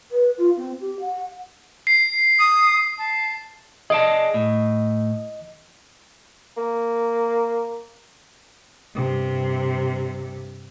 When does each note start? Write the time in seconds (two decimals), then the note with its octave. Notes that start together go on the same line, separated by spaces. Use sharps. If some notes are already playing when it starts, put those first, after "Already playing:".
0.11 B4
0.38 F4
0.57 C4
0.81 G4
1.00 F#5
1.87 C7
2.39 D#6
2.98 A5
3.90 G#4 D5 D#5 A5
4.34 A2
6.57 A#3
8.95 G2 C3